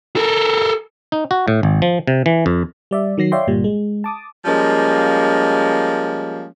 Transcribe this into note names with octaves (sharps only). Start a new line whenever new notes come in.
A4 A#4
D#4
F#4
A2
G#1
F3
C3
E3
F2
G3 D5 E5
D#3 F#3 A#6 C7
C#5 D5 E5 F5 G5 C6
G1 A#2 G3
G#3
A5 D6 D#6
F3 G3 G#3 A#3 C#4